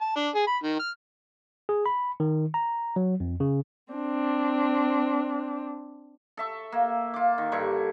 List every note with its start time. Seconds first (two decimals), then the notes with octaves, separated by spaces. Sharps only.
0.01 A5
0.16 D4
0.35 G#4
0.47 B5
0.63 D#3
0.80 F6
1.69 G#4
1.86 B5
2.20 D#3
2.54 A#5
2.96 F#3
3.20 F2
3.40 C#3
3.93 C4 D4
6.37 A4 E5 C#6
6.72 A#3
7.14 F4 D6
7.38 D#3
7.52 G2 D3 E4 C#6